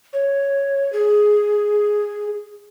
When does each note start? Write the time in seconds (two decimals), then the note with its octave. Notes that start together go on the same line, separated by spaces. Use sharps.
0.13 C#5
0.93 G#4